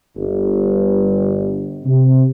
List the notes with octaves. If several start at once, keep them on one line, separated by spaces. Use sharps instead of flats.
G1
C3